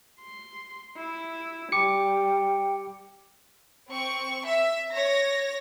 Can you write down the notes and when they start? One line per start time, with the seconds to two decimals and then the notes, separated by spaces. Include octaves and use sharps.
0.21 C6
0.97 E4
1.72 G3 G5 D6 C#7
3.88 C4 C#6
4.46 E5
4.92 C#5 A#6